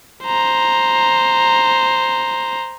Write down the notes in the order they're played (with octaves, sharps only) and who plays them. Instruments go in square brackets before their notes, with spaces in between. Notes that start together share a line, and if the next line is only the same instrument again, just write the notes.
[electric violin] C5 A#5